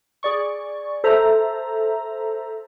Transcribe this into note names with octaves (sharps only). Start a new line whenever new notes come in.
G#4 D5 C#6
A4 C5 E5 A#5